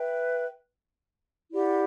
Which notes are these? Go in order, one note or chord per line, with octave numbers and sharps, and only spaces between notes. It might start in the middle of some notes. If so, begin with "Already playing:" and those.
Already playing: B4 E5 G5
E4 G4 D5 F#5